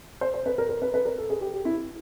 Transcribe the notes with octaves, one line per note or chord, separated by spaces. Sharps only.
C5
C5
B4
A#4
A#4
B4
B4
A#4
A4
G#4
G4
G4
E4